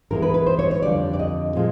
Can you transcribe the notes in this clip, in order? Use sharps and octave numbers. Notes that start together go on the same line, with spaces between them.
G#2 E3 G#3 B3 A#4
B4
B4
C5
C#5
C#5
F2 D3 G3 D5
D5
D#5
A#2 F3 G#3 C4